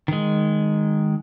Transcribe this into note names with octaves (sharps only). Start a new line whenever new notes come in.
D#3 G#3